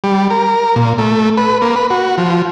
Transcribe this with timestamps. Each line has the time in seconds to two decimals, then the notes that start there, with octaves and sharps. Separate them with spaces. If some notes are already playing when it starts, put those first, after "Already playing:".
0.04 G3
0.30 A#4
0.76 A#2
0.98 A3
1.37 B4
1.62 A#3
1.76 B4
1.90 F#4
2.18 F3